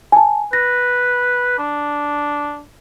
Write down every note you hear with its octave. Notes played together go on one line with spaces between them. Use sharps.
G#5 A5
B4 A#6
D4